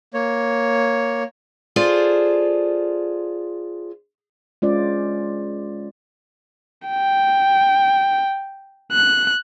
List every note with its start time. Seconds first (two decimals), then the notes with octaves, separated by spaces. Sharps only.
0.14 A#3 C#5
1.76 F4 G#4 A4 C5 D5
4.62 G#3 C#4 F4 C5 D5
6.88 G5
8.92 F#6